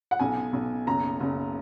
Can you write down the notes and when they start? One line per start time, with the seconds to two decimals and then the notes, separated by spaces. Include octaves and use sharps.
0.11 F#5
0.19 B1 G#5
0.53 B1
0.87 F#1 A#5
1.20 F#1